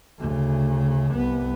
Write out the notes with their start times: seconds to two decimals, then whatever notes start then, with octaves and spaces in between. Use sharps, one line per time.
0.19 D2 C#3
1.14 C2 B3